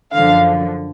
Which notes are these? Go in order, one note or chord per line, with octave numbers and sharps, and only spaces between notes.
F#2 D3 F3 F5